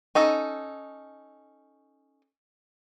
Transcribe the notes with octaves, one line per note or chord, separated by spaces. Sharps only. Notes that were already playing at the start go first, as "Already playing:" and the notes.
C#4 D#4 A4